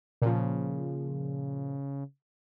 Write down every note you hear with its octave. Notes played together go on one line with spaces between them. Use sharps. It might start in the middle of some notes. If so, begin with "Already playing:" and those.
A#2 C#3 F3